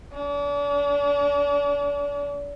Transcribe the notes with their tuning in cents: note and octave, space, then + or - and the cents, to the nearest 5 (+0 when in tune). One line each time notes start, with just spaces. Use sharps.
D4 -40